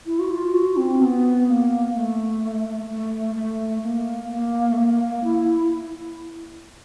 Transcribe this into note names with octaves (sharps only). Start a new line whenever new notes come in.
E4
F#4
F4
F#4
C4
B3
A#3
A3
A3
A3
A#3
A#3
A3
A#3
E4